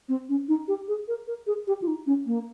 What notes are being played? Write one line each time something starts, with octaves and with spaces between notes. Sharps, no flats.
C4
C#4
D#4
G4
G#4
A#4
A#4
G#4
G4
F4
D#4
C#4
A#3